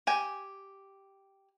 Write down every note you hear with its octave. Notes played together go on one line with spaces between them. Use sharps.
G4 G#5